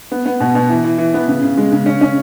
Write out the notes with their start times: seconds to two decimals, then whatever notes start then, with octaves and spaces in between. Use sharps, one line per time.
0.11 B3
0.25 B3
0.40 B2
0.55 B2
0.69 E3
0.84 E3
0.98 E3
1.14 B3
1.28 C#3
1.43 C#3
1.57 G#3
1.72 C#3
1.86 C#4
2.01 C#4